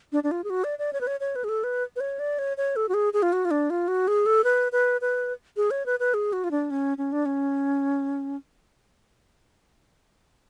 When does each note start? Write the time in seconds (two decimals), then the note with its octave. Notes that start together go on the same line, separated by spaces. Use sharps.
0.12 D4
0.24 D4
0.31 F4
0.44 G#4
0.50 F#4
0.64 D5
0.79 D5
0.93 C#5
1.01 B4
1.07 C#5
1.20 C#5
1.36 B4
1.44 G#4
1.49 A4
1.64 B4
1.96 B4
2.00 C#5
2.19 D5
2.39 C#5
2.57 C#5
2.76 A4
2.89 F#4
2.94 G#4
3.13 G#4
3.22 F4
3.33 F#4
3.45 F4
3.51 D4
3.70 F4
3.88 F#4
4.08 G#4
4.26 A4
4.44 B4
4.72 B4
5.01 B4
5.57 G#4
5.71 C#5
5.86 B4
6.00 B4
6.14 G#4
6.33 F#4
6.44 F4
6.51 D4
6.70 C#4
6.98 C#4
7.12 D4
7.26 C#4